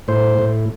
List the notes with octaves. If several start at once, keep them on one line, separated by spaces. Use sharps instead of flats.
A2 C5
A2